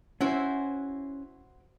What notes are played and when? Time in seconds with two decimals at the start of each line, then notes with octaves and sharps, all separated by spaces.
0.21 C#4 E4 F#4 C5